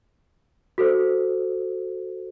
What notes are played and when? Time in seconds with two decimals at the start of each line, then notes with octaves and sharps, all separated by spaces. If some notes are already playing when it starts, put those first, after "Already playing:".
0.78 F#4 A4 C5